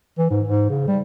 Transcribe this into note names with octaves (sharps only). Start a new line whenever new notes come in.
E3
G#2
G#2
C#3
G3